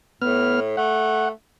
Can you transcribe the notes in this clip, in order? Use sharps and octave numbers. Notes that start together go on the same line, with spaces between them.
A2 B3 F6
A3 F#5